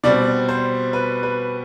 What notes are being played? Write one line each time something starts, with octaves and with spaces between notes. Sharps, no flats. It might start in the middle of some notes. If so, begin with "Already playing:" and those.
B2 G3 C4 D5
C5
B4
B4